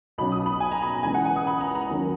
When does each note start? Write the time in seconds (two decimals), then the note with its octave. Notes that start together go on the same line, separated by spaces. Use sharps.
0.18 B1 B2 F#3 C#4 B5
0.32 D#6
0.46 B5
0.60 G#5
0.72 A#5
0.82 B5
0.94 A#5
1.03 C#2 C#3 E3 G#5
1.14 F#5
1.25 G#5
1.36 D#6
1.47 B5
1.61 A#5
1.75 A#5
1.90 D#2 D#3 F#3 C#4